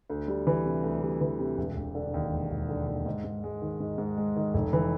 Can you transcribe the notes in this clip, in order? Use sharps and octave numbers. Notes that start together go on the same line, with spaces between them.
D2
G3
E3
C3
D2
G3
E3
C3
E1
E1
D3
D#2
E1
E1
D3
D#2
G#2
G#2
G#3
D#3
G#2
G#2
G#3
D#3
F1
E3